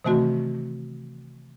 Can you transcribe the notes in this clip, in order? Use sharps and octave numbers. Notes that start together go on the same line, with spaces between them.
C3 D#3 E3 A3 C4 F#4